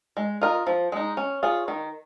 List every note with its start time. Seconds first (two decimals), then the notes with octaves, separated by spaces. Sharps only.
0.17 G#3
0.41 F4 A#4 D#5
0.67 F3
0.92 G#3 D#4
1.17 C#4
1.43 F4 G#4 C#5
1.68 D#3